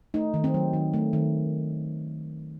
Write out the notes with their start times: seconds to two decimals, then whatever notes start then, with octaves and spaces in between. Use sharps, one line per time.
0.14 A3 D#4
0.34 D#3
0.44 C4
0.54 F#3
0.73 D#3
0.94 A3
1.13 D#3